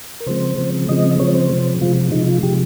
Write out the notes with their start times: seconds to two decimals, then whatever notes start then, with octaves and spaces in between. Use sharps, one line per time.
0.20 A#4
0.26 C#3 F3 G#3 C4 C5
0.58 C#3 F3 G#3 C4
0.89 C#3 F3 G#3 C4 D#5
1.20 C#3 F3 G#3 C4 C#5
1.35 C5
1.50 C3 F3 G#3
1.81 C3 F3 G#3 F4
2.12 C3 F3 G#3 D#4
2.27 F4
2.43 C3 F3 G#3 G4